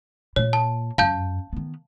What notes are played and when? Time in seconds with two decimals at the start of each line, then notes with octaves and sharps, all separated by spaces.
0.36 A#2 A#3 C#5
0.53 A5
0.98 F#2 F5 A5 G6
1.53 D#3 B3